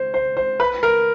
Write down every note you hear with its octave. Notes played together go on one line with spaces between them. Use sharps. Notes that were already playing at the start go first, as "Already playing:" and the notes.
Already playing: C5
C5
C5
B4
A#4